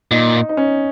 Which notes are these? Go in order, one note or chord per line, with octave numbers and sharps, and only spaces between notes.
A#2 D#4
D#4
C#4